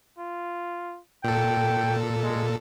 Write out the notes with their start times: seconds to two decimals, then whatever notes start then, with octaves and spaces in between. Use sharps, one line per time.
0.18 F4
1.24 A#2 A4 G5
2.23 G#3